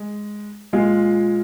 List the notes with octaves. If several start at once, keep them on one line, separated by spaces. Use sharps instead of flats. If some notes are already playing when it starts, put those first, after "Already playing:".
Already playing: G#3
A#2 G#3 F4